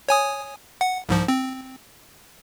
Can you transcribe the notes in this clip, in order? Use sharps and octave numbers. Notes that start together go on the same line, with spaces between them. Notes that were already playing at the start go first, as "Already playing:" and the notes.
C#5 G#5 D#6
F#5
C2 G#2 F3
C4